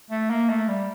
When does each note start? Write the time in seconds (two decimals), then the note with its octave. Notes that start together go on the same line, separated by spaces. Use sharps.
0.11 A3
0.30 A#3
0.49 A3
0.69 G3